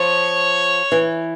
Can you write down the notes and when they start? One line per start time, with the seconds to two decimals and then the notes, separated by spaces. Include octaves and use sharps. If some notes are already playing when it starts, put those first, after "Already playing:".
Already playing: F3 C#5
0.92 E3